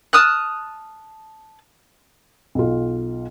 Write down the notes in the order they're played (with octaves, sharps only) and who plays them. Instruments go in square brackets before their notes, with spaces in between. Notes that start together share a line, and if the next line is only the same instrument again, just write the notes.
[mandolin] A5 D#6 F6 F#6
[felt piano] B1 F4